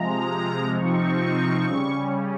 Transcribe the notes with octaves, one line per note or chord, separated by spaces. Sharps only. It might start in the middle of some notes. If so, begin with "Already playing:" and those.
Already playing: C3 F3 G#3 A#5
C3 F3 C4 D#4 C#6
C#3 G3 C#4